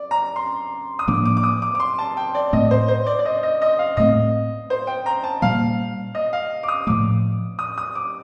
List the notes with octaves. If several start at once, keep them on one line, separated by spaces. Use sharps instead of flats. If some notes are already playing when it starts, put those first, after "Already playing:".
Already playing: D5
A#5
C6
D#6
A2 F3 A#3 D4 D6
D6
D6
D#6
D6
D6
C6
A5
G5
D5
A2 A3 C4 D#5
C5
C5
D5
D5
D#5
D#5
D#5
F5
A2 A3 C4 D#5
C5
G5
A#5
A5
A#2 G3 A#3 F5
D#5
F5
D6
D#6
A2 F3 A3 D6
D#6
D#6
D6